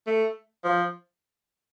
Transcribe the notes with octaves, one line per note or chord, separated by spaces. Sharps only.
A3
F3